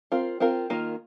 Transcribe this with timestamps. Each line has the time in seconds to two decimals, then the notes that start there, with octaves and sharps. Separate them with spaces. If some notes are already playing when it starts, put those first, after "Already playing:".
0.12 C4 F4 A#4
0.40 C4 F4 A#4
0.70 D#3 A#3 F4 A#4